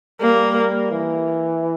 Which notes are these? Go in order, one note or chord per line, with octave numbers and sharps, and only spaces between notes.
G3 A#3
E3